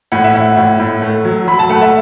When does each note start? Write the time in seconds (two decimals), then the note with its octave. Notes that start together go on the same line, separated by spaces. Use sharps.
0.12 A2 F#5
0.24 E5
0.35 A2 F#5
0.57 A2
0.80 A2
1.02 A3
1.25 F#3
1.47 F#3 B5
1.59 A5
1.69 A3 F#5
1.81 E5